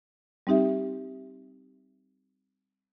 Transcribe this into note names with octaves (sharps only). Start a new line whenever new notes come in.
G3 C4 D#4 G4 E5